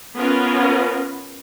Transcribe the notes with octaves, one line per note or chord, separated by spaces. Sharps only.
B3 C#4 F4 A#4 B4